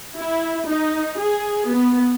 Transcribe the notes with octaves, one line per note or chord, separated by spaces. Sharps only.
E4
D#4
G#4
B3